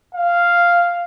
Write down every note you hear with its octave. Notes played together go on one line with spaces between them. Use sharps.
F5